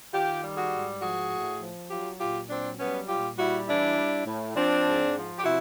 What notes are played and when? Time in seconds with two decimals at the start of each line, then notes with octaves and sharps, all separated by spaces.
0.12 D#3 F4 G4
0.42 G3
0.56 F#4 G#4
0.71 G#2
1.01 F3 F#4 G#4
1.31 A2
1.60 F3
1.90 F#3 F4 G4
2.19 A#2 F4 G4
2.49 F#3 C4 D4
2.78 G3 B3 C#4
3.08 A#2 F4 G4
3.37 G3 E4 F#4
3.67 E3 D4 E4
3.97 G3
4.26 A2
4.56 F3 C4 D4
4.85 G#2
5.15 F3
5.37 G4
5.44 C3 E4 F#4